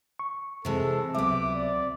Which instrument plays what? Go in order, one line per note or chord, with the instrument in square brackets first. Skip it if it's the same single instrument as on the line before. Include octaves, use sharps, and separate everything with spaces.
[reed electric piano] C#6
[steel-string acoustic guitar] C3 E3 G#3 [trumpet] A4
[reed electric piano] C#2 F#3 E5 [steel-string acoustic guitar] C3 B3 [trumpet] D6
[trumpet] D5